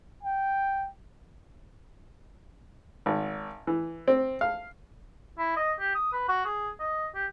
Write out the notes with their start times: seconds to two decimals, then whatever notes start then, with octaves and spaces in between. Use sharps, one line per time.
0.23 G5
3.06 G#1
3.67 E3
4.08 C4
4.41 F5
5.38 E4
5.57 D#5
5.80 G4
5.95 D#6
6.13 B4
6.28 F#4
6.45 G#4
6.80 D#5
7.15 G4